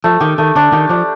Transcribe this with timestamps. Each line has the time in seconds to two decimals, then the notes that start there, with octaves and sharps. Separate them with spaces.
0.04 F3 A3
0.20 D#3 G4
0.38 D#3 A3
0.56 D3 D4
0.72 D#3 G4
0.89 F3 D4